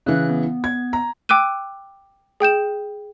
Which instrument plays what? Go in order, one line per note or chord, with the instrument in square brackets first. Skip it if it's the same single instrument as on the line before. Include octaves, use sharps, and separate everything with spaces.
[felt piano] C#3 E3 [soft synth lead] F#6
[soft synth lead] B3
[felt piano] G#6
A#5
[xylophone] G5 D6 E6 F#6 D#7
G#4 G5 G6 E7